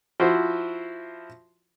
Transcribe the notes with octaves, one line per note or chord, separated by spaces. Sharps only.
F3 E4 F#4 C5